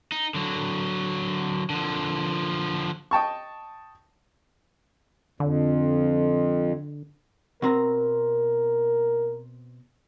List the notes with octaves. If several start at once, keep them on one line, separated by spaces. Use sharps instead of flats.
D#4
D3 F#3
D3 F3
D#5 G5 A5 C#6
F2 D3
B2 C4 A#4 A#5